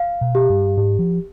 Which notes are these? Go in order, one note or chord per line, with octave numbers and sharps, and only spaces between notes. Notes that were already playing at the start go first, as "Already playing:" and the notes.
Already playing: F5
B2
G4
G2
G#2 G4
F3